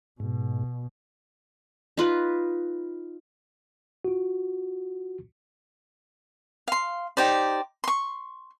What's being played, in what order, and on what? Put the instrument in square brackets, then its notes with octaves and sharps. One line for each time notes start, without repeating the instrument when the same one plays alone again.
[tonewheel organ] G#2 [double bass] B2
[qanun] D#4 F4 B4
[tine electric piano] F4 F#4
[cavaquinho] F5 C6
D#4 G4 C5 D5
C6 C#6